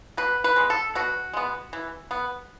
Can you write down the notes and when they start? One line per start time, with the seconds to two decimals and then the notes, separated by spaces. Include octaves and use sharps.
0.17 B2 B4
0.44 B4
0.56 G#3 B3
0.70 A4
0.95 B2 F#4
1.33 G#3 B3
1.73 E3
2.11 B3